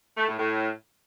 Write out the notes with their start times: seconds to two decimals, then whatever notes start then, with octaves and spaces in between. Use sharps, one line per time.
0.17 A3
0.28 A2
0.39 A2